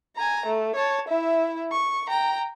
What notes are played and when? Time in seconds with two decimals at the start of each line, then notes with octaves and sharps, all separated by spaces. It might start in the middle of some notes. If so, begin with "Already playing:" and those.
0.16 G#5 A#5
0.46 A3
0.76 C#5 A5
1.08 E4 E5
1.72 C#6
2.09 G5 A#5